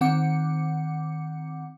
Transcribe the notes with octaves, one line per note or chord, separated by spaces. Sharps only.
D#3 C4 F#5 D6 C#7